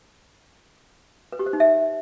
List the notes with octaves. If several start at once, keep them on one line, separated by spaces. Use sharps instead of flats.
B4
G4
C5
D#4
E5